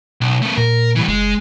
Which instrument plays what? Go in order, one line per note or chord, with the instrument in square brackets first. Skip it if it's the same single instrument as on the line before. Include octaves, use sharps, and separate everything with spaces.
[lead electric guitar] B1
A3 B3
[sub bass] A#2 [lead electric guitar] A#4
[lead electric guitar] E3 G3
[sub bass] F#1 [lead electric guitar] G#3